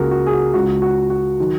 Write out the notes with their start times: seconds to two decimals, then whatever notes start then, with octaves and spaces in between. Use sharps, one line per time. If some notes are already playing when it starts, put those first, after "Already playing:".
Already playing: C#2 C#3 A#3 F#4 G#4 A#4
0.11 F#4
0.26 G#4
0.32 F#4
0.54 C#2 C#3 G#3 F#4
0.82 F#4
1.10 F#4
1.40 D#3 F#3